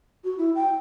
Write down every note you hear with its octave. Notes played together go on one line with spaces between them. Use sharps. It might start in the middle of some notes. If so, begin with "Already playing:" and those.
F#4
E4
G5